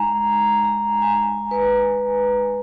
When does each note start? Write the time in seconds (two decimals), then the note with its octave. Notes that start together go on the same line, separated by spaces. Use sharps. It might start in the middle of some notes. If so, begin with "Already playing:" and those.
Already playing: G#3 D#4 G#5 A#5
0.27 G#5
0.64 A#5
1.02 G#5
1.51 B4